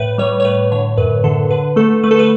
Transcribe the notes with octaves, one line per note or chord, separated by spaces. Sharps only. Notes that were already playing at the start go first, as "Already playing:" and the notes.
Already playing: A2 B4
G3 C#5
C#5
A2 B4
D3 C#5
F#2 B4
D3 A4
D3 B4
A3 A4
A3 B4
A4
B4